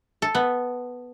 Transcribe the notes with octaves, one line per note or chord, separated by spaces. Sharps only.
A4
B3